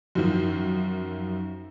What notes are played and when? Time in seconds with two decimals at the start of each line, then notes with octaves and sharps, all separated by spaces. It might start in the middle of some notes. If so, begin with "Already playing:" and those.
0.15 F#2 D#3 F3